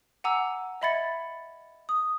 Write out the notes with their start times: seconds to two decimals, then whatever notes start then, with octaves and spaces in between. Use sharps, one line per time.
0.24 F#5 G#5 A#5 D6 E6
0.82 D#5 E5 B5 G#6 A6 C#7
1.89 D#6